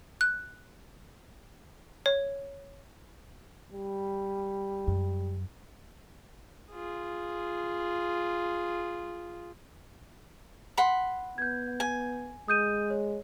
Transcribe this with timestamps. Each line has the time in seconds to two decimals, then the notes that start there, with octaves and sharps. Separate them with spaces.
0.21 F#6
2.06 C#5
3.73 G3
4.87 F#2
6.71 F4 G#4
10.77 F#5 B5 C6
11.38 B3 G6 G#6
11.80 G#5
12.48 G#3 D#6 G6 D#7
12.90 C#5